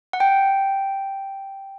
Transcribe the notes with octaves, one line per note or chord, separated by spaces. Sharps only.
F#5
G5